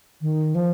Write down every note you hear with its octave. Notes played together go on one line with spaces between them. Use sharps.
D#3
F3